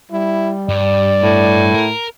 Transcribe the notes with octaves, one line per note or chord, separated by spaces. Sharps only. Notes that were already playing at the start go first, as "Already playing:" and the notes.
G3 E4
G2 D5
A2
A#4